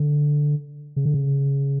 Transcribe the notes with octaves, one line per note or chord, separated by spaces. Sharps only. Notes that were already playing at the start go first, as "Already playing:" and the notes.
Already playing: D3
C#3
D3
C#3